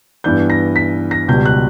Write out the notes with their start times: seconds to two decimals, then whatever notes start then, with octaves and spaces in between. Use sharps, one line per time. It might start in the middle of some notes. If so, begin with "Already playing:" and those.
0.24 G2 E3 B3 D4 G6
0.50 A#6
0.76 B6
1.11 A#6
1.28 C#2 B2 G3 G6
1.45 F#6